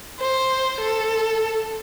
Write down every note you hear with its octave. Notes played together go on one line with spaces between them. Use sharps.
C5
A4